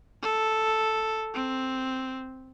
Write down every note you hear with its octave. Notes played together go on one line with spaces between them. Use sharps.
A4
C4